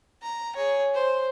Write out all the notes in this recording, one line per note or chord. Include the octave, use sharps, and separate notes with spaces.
A#5
G#4 C#5
C5